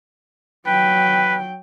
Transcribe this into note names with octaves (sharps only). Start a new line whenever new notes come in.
F#3 B4 G5